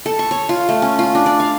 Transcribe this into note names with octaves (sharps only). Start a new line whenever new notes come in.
A4
C#6
C#5
F4
A3
C#4
F4
D4
D5
F5